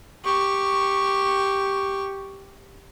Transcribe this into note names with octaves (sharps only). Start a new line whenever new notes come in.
G4 C#6